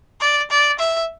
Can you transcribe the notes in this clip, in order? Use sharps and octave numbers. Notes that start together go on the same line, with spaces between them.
D5
D5
E5